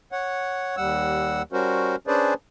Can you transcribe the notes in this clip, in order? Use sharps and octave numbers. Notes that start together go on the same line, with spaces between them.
C#5 F#5
D#2 G3 F#5 E6
G3 C#4 F#4 A#4 C5
C#4 D4 G#4 B4 C5 D5